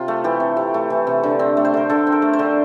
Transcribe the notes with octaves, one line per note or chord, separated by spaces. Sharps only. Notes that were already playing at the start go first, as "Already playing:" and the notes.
Already playing: C3 F4
A3
E3 G4
C3
C3
A3
E3
C3
D3
C4
A3
C5
D3 A#4
D3 A4
C4
A#4
A3
C5
D3